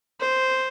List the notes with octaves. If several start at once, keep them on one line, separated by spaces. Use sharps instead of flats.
C5